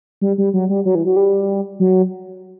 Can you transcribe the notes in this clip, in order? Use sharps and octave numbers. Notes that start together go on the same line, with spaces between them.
G3
G3
F#3
G3
F#3
E3
F#3
G3
F#3